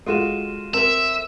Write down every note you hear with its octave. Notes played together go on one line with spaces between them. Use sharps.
G#3 F4 F#4 A4 D#7 E7
C4 A#4 E5